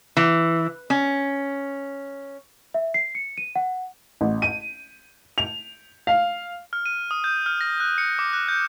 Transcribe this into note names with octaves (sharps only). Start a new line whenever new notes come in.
E3
C#4
E5
C7
C#7
D#7
F#5
A1
D#7
F7
F5
F6
D#7
D#6
G6
F6
A#6
F#6
C#7
D6
F#6
G6